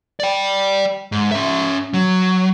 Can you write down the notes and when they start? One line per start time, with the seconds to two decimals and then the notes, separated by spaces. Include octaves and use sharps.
0.20 D5 G5
1.12 G#2
1.32 C#4 E5
1.94 F#3